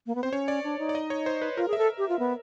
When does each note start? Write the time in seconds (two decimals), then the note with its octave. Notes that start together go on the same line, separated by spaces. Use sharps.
0.06 A#3
0.15 B3
0.23 C4 C5
0.32 C#4 C#5
0.48 D5
0.64 D4
0.79 D#4
0.89 D5
0.95 D#5
1.10 C#5
1.26 C5
1.42 B4
1.56 F4 A#4
1.68 G#4
1.73 E5
1.78 A4
1.98 G4
2.09 F4
2.19 B3